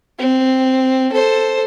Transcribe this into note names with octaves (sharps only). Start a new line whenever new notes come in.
C4
A4 C5